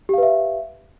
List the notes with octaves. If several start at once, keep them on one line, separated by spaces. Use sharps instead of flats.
G4 B4 E5 F5